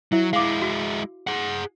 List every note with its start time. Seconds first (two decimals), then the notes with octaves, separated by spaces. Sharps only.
0.12 F#3 E4 E5
0.33 G#3 E4 F5 D6
0.62 F#4
1.27 G#4 F#5